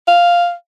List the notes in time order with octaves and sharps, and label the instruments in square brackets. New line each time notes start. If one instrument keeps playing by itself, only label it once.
[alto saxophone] F5